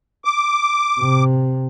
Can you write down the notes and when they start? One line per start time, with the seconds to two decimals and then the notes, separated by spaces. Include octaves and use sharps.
0.25 D6
1.00 C3